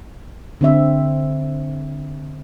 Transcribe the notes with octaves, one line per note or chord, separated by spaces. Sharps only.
D3 C4 E5